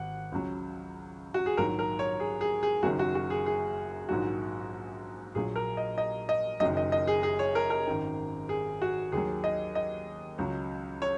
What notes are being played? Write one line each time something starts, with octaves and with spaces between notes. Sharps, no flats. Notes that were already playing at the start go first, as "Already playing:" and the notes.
Already playing: G#1 F#5
C#2 C#3 F#3
F#4
G#4
A#1 G#2 D#3 F#3 A#4
A#4
C#5
G#4
G#4
G#4
F#1 F#2 D#3 F#3 F#4
F#4
F#4
G#4
G#4
A#1 G#2 D#3 F#3 F#4
A#1 A#2 F#3 G#4
A#4
D#5
D#5
D#5
F#1 F#2 D#3 F#3 D#5
D#5
D#5
G#4
G#4
C#5
A#4
A#4
G#1 F#2 D#3
G#4
F#4
D#2 D#3 F#3 G#4
D#5
D#5
C#2 C#3 F#3
C#5